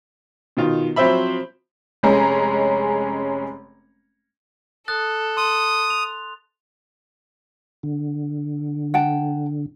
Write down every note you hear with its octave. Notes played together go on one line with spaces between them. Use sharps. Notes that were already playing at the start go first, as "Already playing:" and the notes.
B2 D#3 F4
F3 F#3 C4 C5 E5 B5
F1 G#3 C#4 A#5
A4 D#6 F#6 A6
C6 D#6
F7
D3
F#5 G5 A5